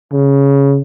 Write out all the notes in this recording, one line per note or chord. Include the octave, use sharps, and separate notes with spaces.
C#3